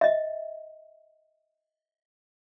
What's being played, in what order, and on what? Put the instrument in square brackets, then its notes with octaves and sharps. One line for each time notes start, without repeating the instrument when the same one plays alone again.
[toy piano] D#5 E5